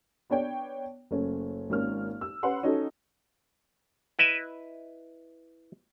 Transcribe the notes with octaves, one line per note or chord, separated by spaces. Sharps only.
B3 D4 C#5 G5
F#1 A3 C#4
G#1 A#3 C#4 F6
E6
C#4 B4 F#5 C6
C#4 D#4 F#4 A4
E4 B4 D#5 E5